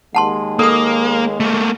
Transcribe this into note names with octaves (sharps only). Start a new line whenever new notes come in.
D#2 G#3 F#5 A5 C6
A#3 A4 D#6
A3 A#3